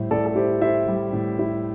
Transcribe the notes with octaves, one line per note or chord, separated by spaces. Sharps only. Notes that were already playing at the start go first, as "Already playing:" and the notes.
Already playing: A2 G3 E4 C5 E5
A2 A4 D5
A4
E4 G4 C5
E4 C5 E5
G3
A2
E4